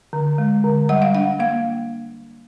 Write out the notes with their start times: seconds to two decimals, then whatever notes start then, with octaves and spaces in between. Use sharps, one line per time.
0.13 D3
0.38 G#3
0.64 D3
0.89 G3 F#5
1.02 F5
1.15 D4 F#5
1.39 A#3 F5